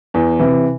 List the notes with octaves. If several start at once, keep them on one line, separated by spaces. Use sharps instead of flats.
E2
C3 E3